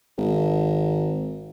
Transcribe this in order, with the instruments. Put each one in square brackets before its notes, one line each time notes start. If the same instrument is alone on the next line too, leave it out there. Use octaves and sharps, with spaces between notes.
[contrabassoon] G#1